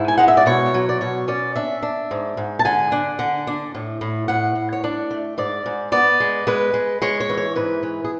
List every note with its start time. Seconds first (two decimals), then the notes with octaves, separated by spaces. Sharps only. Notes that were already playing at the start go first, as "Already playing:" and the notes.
Already playing: G#2 E4
0.08 G#5
0.18 G#3 F#5
0.28 E5
0.37 D5
0.46 B2 C#5
0.74 F#3
0.89 D5
1.01 B2 C#5
1.28 C#4 D5
1.55 D4 E5
1.83 D4
2.11 G#2
2.37 G#2
2.59 A5
2.65 D3 G#5
2.92 D4
3.19 D3
3.47 D4
3.75 A2
4.01 A2
4.28 A2 F#5
4.55 A2
4.73 C#5
4.84 D4 D5
5.11 A3
5.38 G#2 D5
5.66 G#2
5.92 B3 D5
6.20 G#3
6.47 G#3 B4
6.74 G#3
7.02 G#3 C#5
7.20 C#5
7.29 E3
7.37 C#5
7.56 G#2 B4
7.83 E3
8.04 G#4